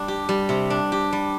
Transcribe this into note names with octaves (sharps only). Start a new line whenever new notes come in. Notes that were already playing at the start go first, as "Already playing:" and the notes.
Already playing: G3 D4
G4
G3
C3
D4
G4
G3